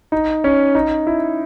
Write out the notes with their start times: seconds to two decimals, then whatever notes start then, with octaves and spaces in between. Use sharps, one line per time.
0.12 D#4
0.44 C#4
0.75 D#4
1.07 E4